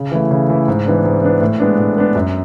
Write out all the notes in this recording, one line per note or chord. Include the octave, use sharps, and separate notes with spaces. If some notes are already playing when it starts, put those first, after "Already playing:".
Already playing: C#3
E3 A3 E4
C#3
E3 A3 E4
G#2
E3 B3 D4
G#2
E3 B3 D4
A2
G#3 B3 D4
A2
G#3 B3 D4
F#2